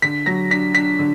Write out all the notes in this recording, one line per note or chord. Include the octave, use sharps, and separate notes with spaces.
D3 B6
F#3 A#6
D4 B6
D4 B6
D3